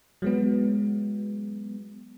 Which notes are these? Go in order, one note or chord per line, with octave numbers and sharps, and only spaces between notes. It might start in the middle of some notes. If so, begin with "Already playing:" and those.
F#3 G#3 B3